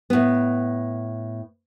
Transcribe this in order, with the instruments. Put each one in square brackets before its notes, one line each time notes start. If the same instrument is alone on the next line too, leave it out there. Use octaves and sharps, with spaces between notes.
[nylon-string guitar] A2 B3